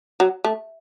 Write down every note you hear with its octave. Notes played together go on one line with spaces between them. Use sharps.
F#3
A3